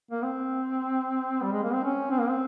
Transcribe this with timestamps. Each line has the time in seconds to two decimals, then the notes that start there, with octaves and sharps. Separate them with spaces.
0.11 A#3
0.23 C4
1.42 G3
1.52 G#3
1.63 A#3
1.73 C4
1.84 C#4
2.10 C4
2.19 A#3
2.29 C4